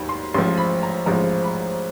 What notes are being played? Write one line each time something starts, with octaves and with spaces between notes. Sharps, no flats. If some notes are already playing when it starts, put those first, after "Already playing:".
Already playing: D#2 D#3 F#3 B5
C6
A1 G#2 F3 C6
B5
A#5
A1 G#2 F3 A#5
B5